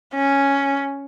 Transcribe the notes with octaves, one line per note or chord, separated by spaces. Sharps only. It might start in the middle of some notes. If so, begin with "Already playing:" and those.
C#4